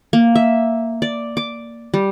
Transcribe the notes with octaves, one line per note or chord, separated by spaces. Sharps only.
A#3
E5
D5
D6
G3